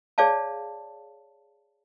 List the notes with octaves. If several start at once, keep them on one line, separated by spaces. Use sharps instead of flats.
G#4 C#5 D5 F5 A5